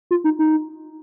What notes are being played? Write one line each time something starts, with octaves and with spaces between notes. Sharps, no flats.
F4
D#4
D#4